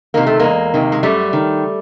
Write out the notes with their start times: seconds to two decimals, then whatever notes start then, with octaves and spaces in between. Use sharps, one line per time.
0.14 C3 D#3 A#3
0.27 A3
0.39 E2 G#3 A#3
0.74 C3 D#3
0.92 G#3
1.03 F#2 G3 A3
1.33 D#3